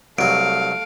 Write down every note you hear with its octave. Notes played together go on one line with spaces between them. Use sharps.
C2 F#3 A3 F5 D7